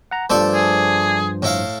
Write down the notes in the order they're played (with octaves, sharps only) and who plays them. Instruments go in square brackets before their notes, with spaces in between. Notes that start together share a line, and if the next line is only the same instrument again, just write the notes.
[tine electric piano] F#5 A#5
[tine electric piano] G2 F3 C5 [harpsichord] A3 A4 D5
[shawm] G#4
[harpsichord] A2 E4 F5